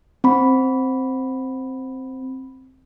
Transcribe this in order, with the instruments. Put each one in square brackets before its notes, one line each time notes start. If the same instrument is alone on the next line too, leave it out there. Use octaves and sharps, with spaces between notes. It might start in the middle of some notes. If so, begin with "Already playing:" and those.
[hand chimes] C4 B5